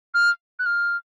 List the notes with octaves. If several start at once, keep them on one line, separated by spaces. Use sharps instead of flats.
F6
F#6
F6